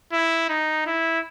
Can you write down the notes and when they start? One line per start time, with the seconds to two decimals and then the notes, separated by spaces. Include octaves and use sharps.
0.13 E4
0.49 D#4
0.87 E4